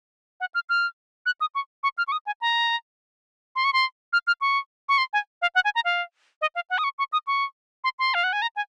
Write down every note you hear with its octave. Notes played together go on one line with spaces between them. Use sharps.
F#5
F6
F6
F#6
D#6
C#6
C#6
F6
C#6
D#6
G#5
A#5
C6
C#6
C6
F6
F6
C#6
C#6
C6
G#5
F5
F#5
G#5
A#5
F5
D#5
F5
F#5
D#6
C#6
C#6
D#6
C#6
C6
C6
F5
F#5
G#5
A#5
G#5